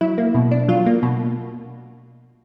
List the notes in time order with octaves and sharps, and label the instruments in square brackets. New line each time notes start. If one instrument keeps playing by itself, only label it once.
[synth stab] F#3 E4
A#3
B2
D4
F#3 F4
A#3
B2